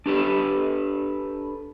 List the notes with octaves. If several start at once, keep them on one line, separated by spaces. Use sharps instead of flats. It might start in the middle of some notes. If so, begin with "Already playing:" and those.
D4 G4 A4 B4